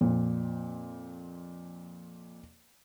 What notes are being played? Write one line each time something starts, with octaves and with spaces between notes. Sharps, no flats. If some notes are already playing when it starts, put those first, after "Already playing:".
F2 A#2